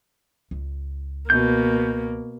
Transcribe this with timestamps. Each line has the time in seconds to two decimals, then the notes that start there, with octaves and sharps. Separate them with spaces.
0.51 C#2
1.30 B2 A#3 G6